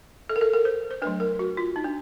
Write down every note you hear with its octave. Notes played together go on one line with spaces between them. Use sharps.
A4
A#4
A4
A#4
C5
C5
F#3 A3 D4 B4
A#4
F#4
F4
D#4
D4